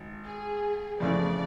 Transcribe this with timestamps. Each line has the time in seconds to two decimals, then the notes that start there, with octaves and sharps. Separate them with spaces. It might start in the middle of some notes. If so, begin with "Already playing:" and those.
Already playing: G#1
0.24 G#4
1.00 F2 C#3 E3 A3 D5